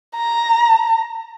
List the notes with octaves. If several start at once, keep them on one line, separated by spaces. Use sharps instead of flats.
A#5